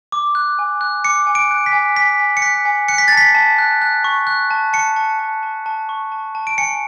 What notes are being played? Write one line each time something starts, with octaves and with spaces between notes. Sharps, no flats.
D6
F#6
G#5
F#6
D6 C#7
G#5
D7
F#6
B6
G#5
G#5 B6
G#5
C#7
F#6 B6
G#5
F#6 C#7
B6
A6
A5
B6
A5
F#6
F#6
C#6
F#6
A5
A5 C#7
A5
A5
A5
A5
C#6
A5
A5
D7
G#5 C#7